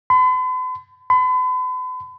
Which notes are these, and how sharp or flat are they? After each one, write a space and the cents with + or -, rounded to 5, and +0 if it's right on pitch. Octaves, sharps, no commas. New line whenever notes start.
B5 +45
B5 +40